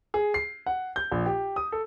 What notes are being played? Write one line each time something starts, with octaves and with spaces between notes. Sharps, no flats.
G#4
C7
F#5
G6
A#1
G4
D#6
A4